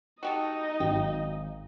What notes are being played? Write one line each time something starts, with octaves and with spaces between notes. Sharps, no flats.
D#4 F#4 G4 A4 D#5
G#1 F#3 G5